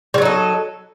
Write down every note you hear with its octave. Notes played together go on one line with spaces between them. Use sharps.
F#3 G3 D#4 A4